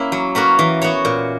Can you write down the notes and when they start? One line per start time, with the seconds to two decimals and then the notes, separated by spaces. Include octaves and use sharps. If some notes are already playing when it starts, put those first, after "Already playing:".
Already playing: A#3 C#4 E4
0.12 F#3
0.35 A#3 C#4 F#4 B4
0.59 E3
0.82 B3 F#4 C#5
1.05 A#2